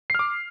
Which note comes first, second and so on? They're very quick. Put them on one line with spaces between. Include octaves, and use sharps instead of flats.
C7 F6 D6